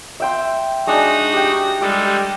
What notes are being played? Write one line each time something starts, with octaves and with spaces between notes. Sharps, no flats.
E5 G5 C6
G#3 D4 D#4 F#4 D#6
G4 G5
G3 G#3 G4 A4